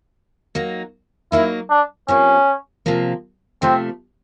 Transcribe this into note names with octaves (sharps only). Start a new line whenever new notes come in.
F#3 A#3 D#4
F#3 A#3 D#4 E4
D4
C3 F3 A#3 C#4
C3 F3 A#3
C3 F3 A3 C4